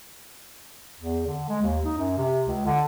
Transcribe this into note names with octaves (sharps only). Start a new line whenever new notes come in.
E2
D3
G#3
D#2
D#4
F#2
C3
C#2
D3